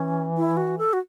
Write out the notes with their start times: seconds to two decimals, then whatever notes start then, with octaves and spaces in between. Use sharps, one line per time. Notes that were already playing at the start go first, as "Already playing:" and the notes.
Already playing: E3 C#4
0.37 E4
0.57 F#4
0.78 A4
0.93 F#4